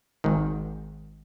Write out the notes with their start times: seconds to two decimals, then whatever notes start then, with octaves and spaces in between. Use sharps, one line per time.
0.24 G#1 G#2 D#3